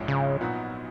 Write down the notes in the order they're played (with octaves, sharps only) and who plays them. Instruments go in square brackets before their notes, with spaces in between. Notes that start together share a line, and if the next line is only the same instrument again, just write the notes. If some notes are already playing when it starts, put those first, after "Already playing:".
Already playing: [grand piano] A#1 G#2 F3 G#3 C#4
[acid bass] C#3
[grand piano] A#2 F#3 B3 D#4 F#4